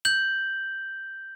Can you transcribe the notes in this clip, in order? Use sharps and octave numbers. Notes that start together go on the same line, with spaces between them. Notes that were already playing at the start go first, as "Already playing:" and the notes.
G6 F#7